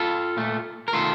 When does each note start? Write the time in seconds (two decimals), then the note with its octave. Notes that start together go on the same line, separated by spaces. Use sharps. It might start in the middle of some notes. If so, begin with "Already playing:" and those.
Already playing: F4 A4
0.37 A#2 A3
0.88 A#4
0.93 D#3 A3 F4 A4